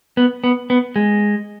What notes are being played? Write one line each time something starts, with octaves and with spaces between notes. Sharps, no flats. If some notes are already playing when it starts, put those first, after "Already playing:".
B3
B3
B3
G#3